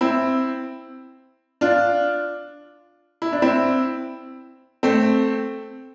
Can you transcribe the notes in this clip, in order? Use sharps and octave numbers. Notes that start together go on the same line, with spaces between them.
C4 E4
D4 F4
E4
D4
C4 E4
A3 C4